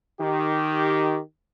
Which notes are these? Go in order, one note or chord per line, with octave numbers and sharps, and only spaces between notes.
D#3 G4